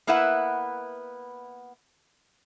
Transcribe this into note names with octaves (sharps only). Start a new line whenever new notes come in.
A#3 B3 E4 B4 E5 F#5